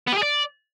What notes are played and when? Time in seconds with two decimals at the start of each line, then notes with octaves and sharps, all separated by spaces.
0.07 B3
0.12 G4
0.17 G#4
0.22 D5